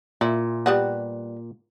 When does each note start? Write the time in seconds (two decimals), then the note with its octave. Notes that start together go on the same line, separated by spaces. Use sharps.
0.21 A#2 E4
0.66 G3 B3 F#4